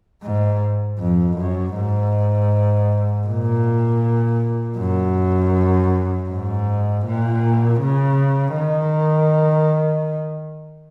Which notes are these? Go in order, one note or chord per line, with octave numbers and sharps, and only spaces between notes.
G#2
F2
F#2
G#2
A#2
F#2
G#2
A#2
C#3
D#3